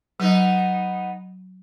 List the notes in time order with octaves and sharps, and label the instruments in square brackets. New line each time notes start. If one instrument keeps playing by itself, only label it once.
[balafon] F#3 [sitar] B3 D#4